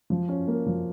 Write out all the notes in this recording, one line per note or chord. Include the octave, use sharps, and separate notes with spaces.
F3
C#4
A#3
F3